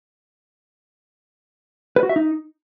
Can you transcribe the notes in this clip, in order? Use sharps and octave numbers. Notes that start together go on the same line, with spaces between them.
B4
F#4
E5
D#4